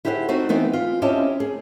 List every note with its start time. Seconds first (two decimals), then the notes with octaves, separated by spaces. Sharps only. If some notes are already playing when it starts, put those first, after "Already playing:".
0.05 E4 G4 G#4 C5 F5 F#5
0.28 C4 D#4 F#4 A4 C5
0.49 E3 B3 C4 D#4
0.73 F4
1.02 C4 C#4 E4 G4 D#5 A5
1.40 G#4